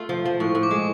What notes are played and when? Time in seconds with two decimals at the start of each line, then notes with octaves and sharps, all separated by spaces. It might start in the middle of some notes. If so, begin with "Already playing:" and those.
Already playing: A3 F4
0.09 F3
0.26 F3
0.40 A2 C#6
0.55 A2
0.63 D6
0.71 G#3